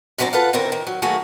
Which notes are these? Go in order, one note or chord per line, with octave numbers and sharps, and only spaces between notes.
F#2 D3 F#3 C4 D5 A#5
F4 A4 B4 F5 F#5
D3 D#3 C4 E4 A#4
D#3
F#3
D#3 F#3 A3 A#3 F#4 G#4